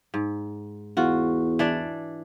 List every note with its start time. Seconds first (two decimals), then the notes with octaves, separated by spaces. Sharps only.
0.14 G#2
0.97 E2 F4 F#4
1.59 E3 D4 D5